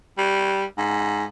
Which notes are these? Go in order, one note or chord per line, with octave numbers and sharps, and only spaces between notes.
G3
G#2